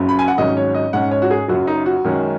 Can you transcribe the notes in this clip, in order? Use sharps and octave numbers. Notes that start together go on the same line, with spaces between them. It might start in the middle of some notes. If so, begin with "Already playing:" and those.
Already playing: F#1 F#2 C#3 F#3
B5
G#5
F#5
G#1 G#2 F#3 C#4 D#5
C#5
D#5
G#2 G#3 C#4 F#5
C#5
F#4
G#4
F#1 F#2 F#3 F#4
D#4
F#4
F#2 D#3 G#3 C#4